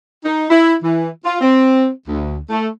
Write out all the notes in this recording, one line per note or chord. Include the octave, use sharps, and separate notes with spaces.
D#4
E4
E3
F4
C4
D2
A3